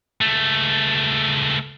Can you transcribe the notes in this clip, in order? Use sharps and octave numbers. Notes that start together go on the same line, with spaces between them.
C#2 A3